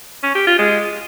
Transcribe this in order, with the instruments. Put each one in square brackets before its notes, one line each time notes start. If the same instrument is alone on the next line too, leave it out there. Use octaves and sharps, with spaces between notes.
[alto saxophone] C#4
G4
F4
G#3